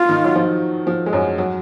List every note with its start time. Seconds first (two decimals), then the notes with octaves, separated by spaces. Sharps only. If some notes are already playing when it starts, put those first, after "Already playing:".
Already playing: F4
0.09 D#3 D#4
0.24 F#3
0.36 F3
0.87 F3
1.06 G#3
1.13 F#2 F#3
1.38 F#3